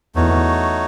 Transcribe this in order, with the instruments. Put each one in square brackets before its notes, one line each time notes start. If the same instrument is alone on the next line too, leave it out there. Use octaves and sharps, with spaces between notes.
[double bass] E2 [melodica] A3 D#4 F#4 C#5